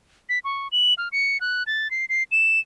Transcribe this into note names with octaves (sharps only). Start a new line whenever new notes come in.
B6
C#6
F#7
F6
C#7
F#6
A6
C7
C7
E7